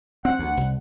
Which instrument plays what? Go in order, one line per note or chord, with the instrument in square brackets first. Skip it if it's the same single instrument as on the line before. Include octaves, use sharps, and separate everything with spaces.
[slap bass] C4 [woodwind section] F#5
[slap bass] D2
C2